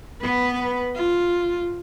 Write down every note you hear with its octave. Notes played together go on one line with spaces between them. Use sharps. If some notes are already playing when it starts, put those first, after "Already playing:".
B3 B4
F4